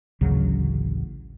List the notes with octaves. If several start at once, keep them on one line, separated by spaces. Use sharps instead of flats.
A1 D2 C#3 F#3